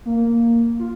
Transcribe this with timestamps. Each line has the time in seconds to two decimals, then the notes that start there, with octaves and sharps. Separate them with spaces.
0.05 A#3
0.79 F4